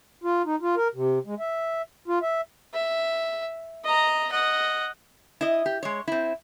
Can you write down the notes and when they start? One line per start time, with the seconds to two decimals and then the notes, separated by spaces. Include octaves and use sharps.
0.24 F4
0.46 D#4
0.62 F4
0.77 A#4
0.95 C3
1.26 G#3
1.39 E5
2.08 F4
2.22 E5
2.74 E5
3.85 D#5 A#5
4.32 D#5 F#5
5.41 E4 D#5
5.66 G4
5.83 G#3 C#5
6.07 C4 E4